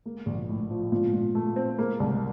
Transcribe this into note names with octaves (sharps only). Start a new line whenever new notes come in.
A#3
A#1
A2
F3
A#2
A#2
A3
C4
A#3
C2